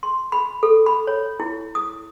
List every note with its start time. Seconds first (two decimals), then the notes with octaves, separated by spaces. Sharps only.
0.03 C6
0.32 B5
0.63 A4
0.86 B5
1.07 C#5
1.40 E4
1.75 D#6